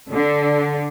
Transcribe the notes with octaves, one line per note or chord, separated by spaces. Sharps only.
D3